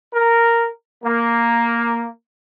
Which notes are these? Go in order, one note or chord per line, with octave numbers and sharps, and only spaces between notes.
A#4
A#3